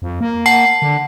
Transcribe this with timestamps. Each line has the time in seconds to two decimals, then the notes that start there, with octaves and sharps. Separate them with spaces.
0.02 F2
0.21 A#3
0.46 F#5 A5 C7
0.82 D3